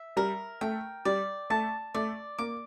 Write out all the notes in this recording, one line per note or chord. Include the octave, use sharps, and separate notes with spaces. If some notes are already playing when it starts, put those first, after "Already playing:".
Already playing: E5
G3 A#4
A3 G5
G3 D5
A3 A5
A3 D5
A#3 D6